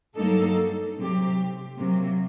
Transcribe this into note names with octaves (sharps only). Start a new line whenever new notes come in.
G2 F#3 A#3 D#4 A4
C3 F#3 C4 G4
C3 F#3 A#3